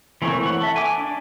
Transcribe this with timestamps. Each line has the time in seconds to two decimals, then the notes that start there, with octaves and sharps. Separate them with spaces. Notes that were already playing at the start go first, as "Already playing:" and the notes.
0.22 E3 A3 A#3 C4 C#5
0.43 F#5 C#6
0.61 A4 E5
0.76 G#5 D6
0.98 D4